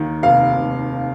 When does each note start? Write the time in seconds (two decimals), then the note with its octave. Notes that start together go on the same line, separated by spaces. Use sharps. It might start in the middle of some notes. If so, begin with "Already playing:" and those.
Already playing: D#2 D#3
0.23 F1 F5
0.57 F1